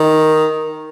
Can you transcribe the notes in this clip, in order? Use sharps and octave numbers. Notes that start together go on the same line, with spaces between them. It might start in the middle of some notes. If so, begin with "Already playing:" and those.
Already playing: D#3